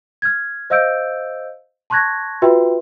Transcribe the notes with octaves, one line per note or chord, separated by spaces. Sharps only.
F6 G#6
C5 D#5 F5 E6 G6 D7
A5 C6 C#6 F#6 G#6 A#6
F4 F#4 B4 E5 G5 C6